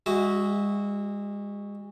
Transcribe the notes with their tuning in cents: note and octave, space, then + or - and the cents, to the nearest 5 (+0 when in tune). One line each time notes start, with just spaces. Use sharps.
G#3 -35 F#4 +0 E5 -35